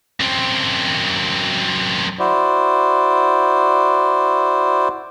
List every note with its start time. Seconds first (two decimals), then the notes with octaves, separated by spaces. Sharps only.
0.20 F#2 C4
2.19 E4 F#4 C5 D5